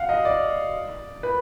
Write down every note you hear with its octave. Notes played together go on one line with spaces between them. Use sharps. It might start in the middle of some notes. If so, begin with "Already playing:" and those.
Already playing: F5 F#5
D#5
D5
B4